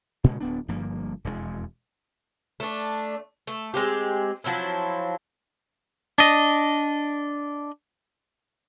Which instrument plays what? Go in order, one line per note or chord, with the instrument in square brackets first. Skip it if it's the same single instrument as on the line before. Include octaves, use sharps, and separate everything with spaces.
[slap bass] A#2 C#3 G#3
D1 B3 D4
G1 G2 F3 A#3
E1 F2 C3 G#3
[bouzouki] A3 D4
A3
G#3 C4 G4
F3 F#3 C4 E4
[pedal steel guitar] D4 D#5